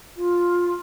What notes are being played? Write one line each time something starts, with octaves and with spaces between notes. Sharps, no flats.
F4